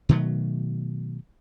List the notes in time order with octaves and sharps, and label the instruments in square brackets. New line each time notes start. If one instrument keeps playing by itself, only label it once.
[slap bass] B2 D#3 F#3 A3